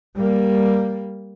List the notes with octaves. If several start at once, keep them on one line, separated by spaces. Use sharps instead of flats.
G3 A#3